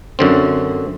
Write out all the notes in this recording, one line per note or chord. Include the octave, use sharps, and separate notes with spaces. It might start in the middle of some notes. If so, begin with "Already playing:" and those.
F#2 D3 C4